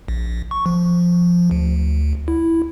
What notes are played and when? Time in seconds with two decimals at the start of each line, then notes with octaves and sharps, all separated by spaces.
0.08 A#1
0.51 C#6
0.66 F3
1.51 D2
2.28 E4